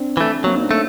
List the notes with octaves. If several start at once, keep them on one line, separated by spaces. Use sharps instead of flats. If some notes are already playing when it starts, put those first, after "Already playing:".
Already playing: C4 D4
E3 A3
F#3 A#3 C4
D#4
C4 D4
A3